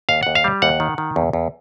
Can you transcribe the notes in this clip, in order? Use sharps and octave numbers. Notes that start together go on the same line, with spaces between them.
D#2 F5
D#2 F#5
F5
G3
D#2 F#5
D#3
D#3
E2
E2